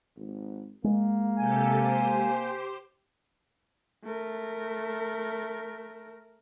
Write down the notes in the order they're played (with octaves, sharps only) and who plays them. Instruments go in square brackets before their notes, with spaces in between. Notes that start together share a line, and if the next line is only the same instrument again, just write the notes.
[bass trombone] G#1
[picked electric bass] G#3 [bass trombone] A#3
[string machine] C3 G4 A4 [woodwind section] G#5
[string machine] G4 C5
[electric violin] A3 A#4